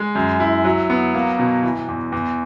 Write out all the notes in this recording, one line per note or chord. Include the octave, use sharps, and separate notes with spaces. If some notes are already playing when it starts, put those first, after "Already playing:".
Already playing: G#3
F#2
E4
F#3
B3
A#3
B2
E3
E2
E2